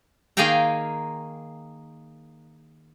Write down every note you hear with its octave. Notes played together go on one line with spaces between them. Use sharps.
D#3 A#3 G#4 F5 G5 A#5